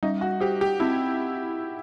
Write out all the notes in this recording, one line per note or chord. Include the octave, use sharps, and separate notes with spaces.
G3 D#4
F#4
F#4 G4
G4
C4 E4